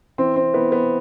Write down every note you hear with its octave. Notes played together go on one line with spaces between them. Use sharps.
E3 C4
C4
E3 B3
B3